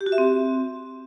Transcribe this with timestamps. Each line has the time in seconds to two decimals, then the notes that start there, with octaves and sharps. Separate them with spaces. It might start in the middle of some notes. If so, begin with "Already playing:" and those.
0.01 G4
0.06 F#4
0.12 E5
0.18 C4